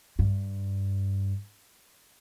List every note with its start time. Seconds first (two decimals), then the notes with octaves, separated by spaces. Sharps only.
0.19 G2